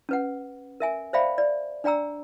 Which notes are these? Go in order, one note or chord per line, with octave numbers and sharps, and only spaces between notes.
C#4 B4 F#5
A#4 E5 G#5
C5 D5 E5 F5 G5 B5
D5
D4 D5 G5 A#5 E6